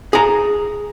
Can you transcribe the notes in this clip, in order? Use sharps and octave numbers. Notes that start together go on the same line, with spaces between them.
G#4 A#5